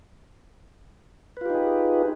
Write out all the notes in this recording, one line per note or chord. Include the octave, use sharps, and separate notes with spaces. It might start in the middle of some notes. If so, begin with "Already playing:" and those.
D#4 F4 G4 G#4 B4